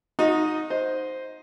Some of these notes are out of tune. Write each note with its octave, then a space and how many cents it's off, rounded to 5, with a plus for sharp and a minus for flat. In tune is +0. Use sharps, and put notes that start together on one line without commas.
D#4 +0 F#4 -40 D#5 +10
C5 +0 D#5 +10